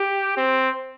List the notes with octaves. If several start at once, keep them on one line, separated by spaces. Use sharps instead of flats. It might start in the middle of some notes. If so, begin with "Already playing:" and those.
Already playing: G4
C4